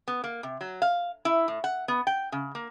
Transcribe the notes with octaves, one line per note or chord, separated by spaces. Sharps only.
B3
A#3
C3
F#3
F5
E4
A2
F#5
B3
G5
C#3
A#3